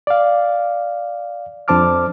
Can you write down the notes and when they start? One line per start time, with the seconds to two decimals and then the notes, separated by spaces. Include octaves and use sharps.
0.07 D5 F5
1.68 F2 D4 C5 A5 D6 F6